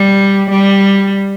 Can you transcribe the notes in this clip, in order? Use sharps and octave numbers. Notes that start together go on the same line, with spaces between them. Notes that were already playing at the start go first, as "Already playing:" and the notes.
Already playing: G3
G3